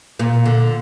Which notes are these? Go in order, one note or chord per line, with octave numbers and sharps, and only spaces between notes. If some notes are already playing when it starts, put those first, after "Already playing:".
A#2
D3